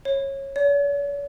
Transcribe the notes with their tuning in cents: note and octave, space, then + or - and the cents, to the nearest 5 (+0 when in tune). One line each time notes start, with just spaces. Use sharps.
C#5 -20
C#5 +45